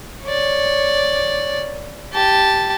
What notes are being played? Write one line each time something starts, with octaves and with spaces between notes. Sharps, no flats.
C#5 D5
G4 A5